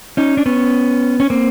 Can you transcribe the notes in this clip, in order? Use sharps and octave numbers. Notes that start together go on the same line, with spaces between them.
C#4 D#4
D4
B3 C#4
C#4
A#3 C4